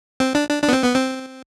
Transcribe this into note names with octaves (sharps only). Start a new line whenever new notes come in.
C4
D4
D4
D4
B3
C4
B3
C4